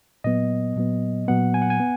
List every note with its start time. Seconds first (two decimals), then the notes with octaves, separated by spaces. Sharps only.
0.24 A#2 F#3 B3 D#5
0.76 A#2 F#3 B3
1.28 A#2 F#3 B3 F#5
1.54 G#5
1.62 F#5
1.70 G#5
1.80 B3